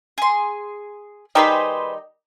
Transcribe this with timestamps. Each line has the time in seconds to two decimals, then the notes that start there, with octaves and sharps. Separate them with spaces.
0.18 G#4 C6
1.35 D#3 G3 D#4 G#4 B4 C5